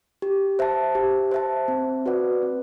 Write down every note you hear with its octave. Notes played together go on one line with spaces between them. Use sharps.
G4
C5 E5 A5
G4
C5 E5 A5
C4
F#4 B4 D5 F#5
C4